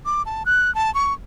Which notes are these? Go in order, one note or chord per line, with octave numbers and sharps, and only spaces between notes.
D6
A5
F#6
A5
C#6